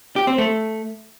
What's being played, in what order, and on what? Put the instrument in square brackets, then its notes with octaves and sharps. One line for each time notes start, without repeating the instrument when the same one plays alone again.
[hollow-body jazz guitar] G4
C4
A3